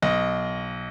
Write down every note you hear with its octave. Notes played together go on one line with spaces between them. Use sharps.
B1 D#5